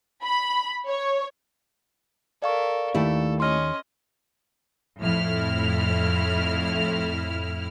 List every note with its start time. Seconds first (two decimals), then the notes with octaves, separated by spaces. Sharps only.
0.24 B5
0.87 C#5
2.42 A4 A#4 D5 F5 C#6
2.95 D#2 D#3 A3 E4 G4 A4
3.40 C#4 D#5 C6 F6
4.99 F2 A2 E4 F6